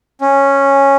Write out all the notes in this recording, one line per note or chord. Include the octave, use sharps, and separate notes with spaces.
C#4